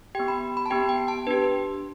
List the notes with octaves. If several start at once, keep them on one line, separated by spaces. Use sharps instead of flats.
B3 G4 G5
B5
B5
A5
B3 G4 G5
G5
A5
D4 G4 B4